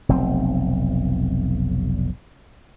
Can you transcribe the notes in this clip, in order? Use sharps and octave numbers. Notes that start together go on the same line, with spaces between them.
F1 B1 C4